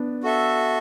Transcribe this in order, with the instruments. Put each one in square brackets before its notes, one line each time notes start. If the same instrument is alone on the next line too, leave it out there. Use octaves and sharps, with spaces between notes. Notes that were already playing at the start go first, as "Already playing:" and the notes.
Already playing: [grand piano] B3 D4
[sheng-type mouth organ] F#4 A4 E5